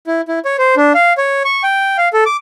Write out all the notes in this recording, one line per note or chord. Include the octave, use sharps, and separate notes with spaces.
E4
E4
C#5
C5
D4
F5
C#5
C#6
G5
F5
A4
D6